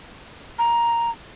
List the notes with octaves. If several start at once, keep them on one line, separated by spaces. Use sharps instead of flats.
A#5